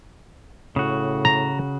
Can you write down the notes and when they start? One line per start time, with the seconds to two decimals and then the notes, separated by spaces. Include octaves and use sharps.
0.76 A2 C#3 F#4
1.25 A#5